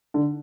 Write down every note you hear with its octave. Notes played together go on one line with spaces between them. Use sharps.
D3